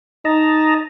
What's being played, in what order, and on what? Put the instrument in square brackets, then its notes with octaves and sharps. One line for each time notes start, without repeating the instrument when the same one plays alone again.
[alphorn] D#4 [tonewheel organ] D#5 A5 A#5